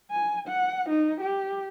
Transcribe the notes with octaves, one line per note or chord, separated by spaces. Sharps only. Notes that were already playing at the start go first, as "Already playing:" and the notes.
G#5
F#5
D#4
G4